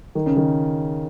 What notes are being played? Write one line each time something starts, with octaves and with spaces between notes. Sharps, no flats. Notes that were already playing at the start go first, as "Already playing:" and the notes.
D#3
C#3
D#3